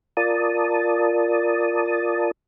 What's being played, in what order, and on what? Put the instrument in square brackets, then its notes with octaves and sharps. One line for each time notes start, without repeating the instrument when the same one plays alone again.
[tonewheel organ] F4 A#4 D5 A5 D#6